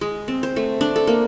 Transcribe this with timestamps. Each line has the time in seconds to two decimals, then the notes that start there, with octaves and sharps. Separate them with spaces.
0.01 G#3
0.28 C4
0.43 C5
0.56 A3
0.81 D4
0.96 A4
1.07 A#3